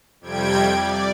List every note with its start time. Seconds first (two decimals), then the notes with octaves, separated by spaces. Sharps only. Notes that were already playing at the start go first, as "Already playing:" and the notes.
0.21 F2 C3 G3 G5 G#6 D7
0.67 D5